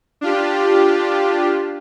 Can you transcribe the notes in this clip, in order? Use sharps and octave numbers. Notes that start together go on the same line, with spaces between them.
D4 F4 G4